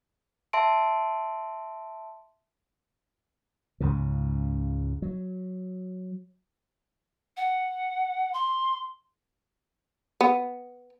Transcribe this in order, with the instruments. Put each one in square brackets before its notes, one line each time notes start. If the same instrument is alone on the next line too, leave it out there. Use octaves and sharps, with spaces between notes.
[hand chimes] E5 A5 C6 D7
[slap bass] C#2 G#2 C#3
F#3
[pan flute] F#5
C6
[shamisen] B3